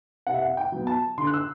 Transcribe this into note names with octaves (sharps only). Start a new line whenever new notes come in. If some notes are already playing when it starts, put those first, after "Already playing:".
C3 F#5
E5
F#5
G5
F#3 B3
A5
D3 C6
F#6
E6